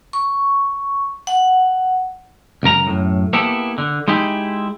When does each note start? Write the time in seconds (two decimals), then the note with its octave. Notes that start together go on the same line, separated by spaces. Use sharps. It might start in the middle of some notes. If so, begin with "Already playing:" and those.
0.13 C#6
1.27 F#5
2.63 C#2 F#2 A#4 A#5
2.87 F#2 A2
3.33 A#3 B3 E4 G4 A4
3.78 D3
4.08 G#3 D#4 E4 G4